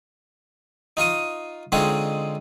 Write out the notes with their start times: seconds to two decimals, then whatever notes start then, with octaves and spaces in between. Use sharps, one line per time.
0.97 D#4 F4 C#6 D#6
1.72 D3 G#3 C4 D#4 F4 C#5